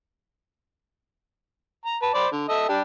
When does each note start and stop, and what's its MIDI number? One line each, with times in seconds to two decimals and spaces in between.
1.85 1.97 82
2.02 2.10 71
2.02 2.10 81
2.14 2.27 72
2.14 2.27 74
2.14 2.27 83
2.32 2.47 50
2.49 2.69 69
2.49 2.69 75
2.49 2.69 76
2.69 2.82 55
2.69 2.82 62
2.69 2.82 67